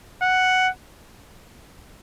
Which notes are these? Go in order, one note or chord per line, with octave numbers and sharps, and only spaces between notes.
F#5